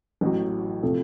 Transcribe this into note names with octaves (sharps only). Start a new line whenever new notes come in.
A1 A2 F#3
C3 F3 A3